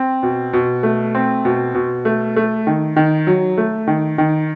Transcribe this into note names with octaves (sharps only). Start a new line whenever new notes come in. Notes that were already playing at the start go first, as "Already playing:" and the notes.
Already playing: C4
B2
B2
A3
C4
B2
B2
A3
A3
D#3
D#3
F#3
A3
D#3
D#3